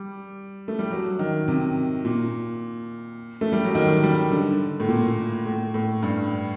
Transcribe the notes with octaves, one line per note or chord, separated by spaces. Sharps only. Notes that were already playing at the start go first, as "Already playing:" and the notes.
Already playing: G3
A3
G3
F#3
D#3
C3
A#2
A3
G3
F#3
D#3
G3
D3
A2
A#2
A2
A2
G2